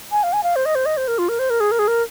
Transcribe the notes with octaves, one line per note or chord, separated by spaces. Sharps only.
G#5
F5
G#5
F5
C5
D#5
C5
D#5
C5
A#4
F4
A#4
C5
A#4
G#4
A#4
G#4
A#4